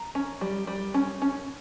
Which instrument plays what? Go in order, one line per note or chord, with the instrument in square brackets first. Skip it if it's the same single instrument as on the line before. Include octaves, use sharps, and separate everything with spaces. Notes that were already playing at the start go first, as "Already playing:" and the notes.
Already playing: [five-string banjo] A#5
C#4
G3
G3
C#4
C#4